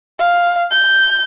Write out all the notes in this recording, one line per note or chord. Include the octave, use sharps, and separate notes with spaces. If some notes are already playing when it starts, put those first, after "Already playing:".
F5
G6